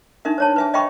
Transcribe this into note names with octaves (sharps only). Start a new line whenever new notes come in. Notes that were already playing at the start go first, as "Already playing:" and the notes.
D4 D#4 A#4 E5
C5 C#5 A5
B4 E5 G#5
D#5 E5 G5 B5 C#6